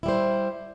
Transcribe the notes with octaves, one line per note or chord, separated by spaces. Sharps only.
G3 E4 C5